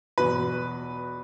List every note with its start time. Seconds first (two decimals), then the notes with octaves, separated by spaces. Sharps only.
0.18 E2 B2 F#3 B4